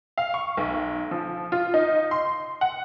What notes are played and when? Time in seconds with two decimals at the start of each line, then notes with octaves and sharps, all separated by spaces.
0.18 F5
0.34 C#6
0.57 B1
1.11 F3
1.52 F4
1.74 D#4
2.11 C6
2.61 F#5